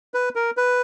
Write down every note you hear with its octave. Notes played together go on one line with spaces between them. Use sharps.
B4
A#4
B4